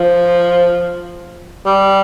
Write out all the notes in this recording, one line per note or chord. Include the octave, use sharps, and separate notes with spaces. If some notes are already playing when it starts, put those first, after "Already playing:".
Already playing: F3
G3